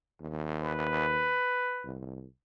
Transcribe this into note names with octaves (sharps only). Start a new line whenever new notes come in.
D#2
B4
C2